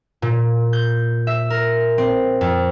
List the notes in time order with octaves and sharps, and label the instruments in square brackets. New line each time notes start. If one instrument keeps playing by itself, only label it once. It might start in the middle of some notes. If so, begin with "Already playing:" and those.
[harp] A#2
G6
E5
A#4
C4
F2